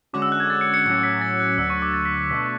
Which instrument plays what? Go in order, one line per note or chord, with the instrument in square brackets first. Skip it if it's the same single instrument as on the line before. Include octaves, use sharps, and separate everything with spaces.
[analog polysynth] D3 G#3 C#4 F#4 [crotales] D6
[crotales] E6
F#6
G#6
A6
C#7
C#7
[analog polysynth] A2 F#3 C#4 [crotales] C#7
[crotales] B6
A6
F#6
[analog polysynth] D2 D3 F#3 [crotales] E6
[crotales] C#6
D6
A6
B6
B6
[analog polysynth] B2 A3 D4 [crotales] B6